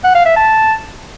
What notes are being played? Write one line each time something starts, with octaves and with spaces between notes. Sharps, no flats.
F#5
F5
E5
A5